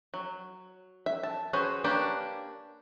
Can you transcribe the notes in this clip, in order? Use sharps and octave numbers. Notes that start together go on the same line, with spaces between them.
F#3
E5
A5
C#4 F#4 G#4 B4 C5
A#3 C#4 D4 G4 B4